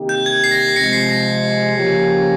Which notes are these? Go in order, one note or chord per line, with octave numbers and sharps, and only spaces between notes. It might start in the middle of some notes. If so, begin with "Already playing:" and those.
Already playing: C3 D#3 A#3 D#4 G4
G6
G#6
C7
A#6
C3 F3 G#3 A#6 C#7
C7
A#6
C#3 F3 A#3 C#4 G4